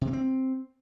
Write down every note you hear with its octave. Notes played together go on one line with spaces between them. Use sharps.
C3
A#3
C4